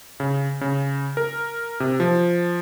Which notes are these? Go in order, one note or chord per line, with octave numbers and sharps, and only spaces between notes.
C#3
C#3
A#4
C3
F3